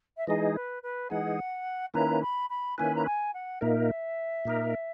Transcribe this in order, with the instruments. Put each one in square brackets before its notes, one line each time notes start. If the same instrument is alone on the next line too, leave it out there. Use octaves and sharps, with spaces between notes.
[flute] E5
[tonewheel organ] E3 G#3 D#4 G#4 [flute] D#5
[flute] B4
B4
[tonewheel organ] E3 G#3 D#4 G#4 [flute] F#5
[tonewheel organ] D#3 A#3 C#4 E4 B4 [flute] A#5
[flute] B5
B5
[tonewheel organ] D#3 A#3 C#4 E4 B4 [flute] G#5
[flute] A#5
G#5
F#5
[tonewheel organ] A#2 A#3 D#4 A#4 [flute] E5
[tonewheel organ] A#2 A#3 D#4 A#4